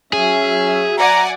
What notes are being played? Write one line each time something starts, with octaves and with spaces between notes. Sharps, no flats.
F#3 C#4 G#4 E5
D5 F#5 G#5 A#5